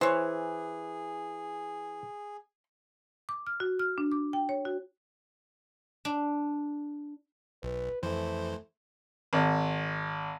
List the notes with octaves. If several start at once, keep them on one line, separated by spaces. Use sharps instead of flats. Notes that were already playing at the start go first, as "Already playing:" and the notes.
E3 G#4 C5 C#5
D6
F6
F#4
F6
D4
D6
G5
C#5
F#4
D4
B1 B4
F2 E3 A3 C5
G#1